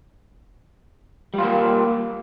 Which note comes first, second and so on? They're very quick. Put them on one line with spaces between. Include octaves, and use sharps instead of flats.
G3 F4 A#3